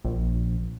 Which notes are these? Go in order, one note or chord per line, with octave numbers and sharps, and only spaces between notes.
A#1